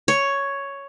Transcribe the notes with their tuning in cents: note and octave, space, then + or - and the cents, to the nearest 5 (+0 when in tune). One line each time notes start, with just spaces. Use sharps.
C#5 +5